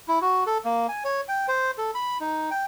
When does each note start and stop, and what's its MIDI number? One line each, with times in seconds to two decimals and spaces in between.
0.08 0.19 64
0.21 0.44 66
0.47 0.58 69
0.65 0.87 58
0.89 1.04 80
1.04 1.21 73
1.28 1.46 79
1.48 1.71 72
1.78 1.91 69
1.95 2.18 83
2.20 2.50 63
2.51 2.65 79